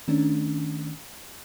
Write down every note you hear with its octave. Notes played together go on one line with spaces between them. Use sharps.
D#3 A3 C#4 D4